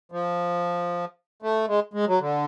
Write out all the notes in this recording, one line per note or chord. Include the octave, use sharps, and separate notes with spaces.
F3
A3
G#3
G#3
F#3
D3